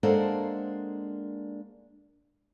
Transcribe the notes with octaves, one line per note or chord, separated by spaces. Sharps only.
G#3 A#3 D4 A4 C5 F#5